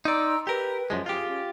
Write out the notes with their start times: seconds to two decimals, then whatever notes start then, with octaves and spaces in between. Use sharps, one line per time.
0.05 D#4 D5 A#5 C6 E6
0.47 G4 A#4 B4
0.90 F#2 F3 G#3
1.06 F4 G4 G#4
1.27 C#4